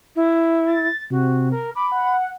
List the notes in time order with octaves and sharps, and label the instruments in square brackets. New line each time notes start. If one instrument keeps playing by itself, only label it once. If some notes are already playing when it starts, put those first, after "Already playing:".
[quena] E4
[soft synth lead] A6
[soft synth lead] C3 [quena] F#4
[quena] A#4
[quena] B5 [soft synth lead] D6
[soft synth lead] F#5